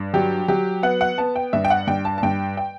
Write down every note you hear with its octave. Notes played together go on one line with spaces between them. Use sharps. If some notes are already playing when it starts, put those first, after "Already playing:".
Already playing: G2
F#3 G4
F#3 G4
B3 F#5
F#5
B3 A5
G5
G2 E5
G5
F#5
G2 G5
A5
A5
G2 G5
G5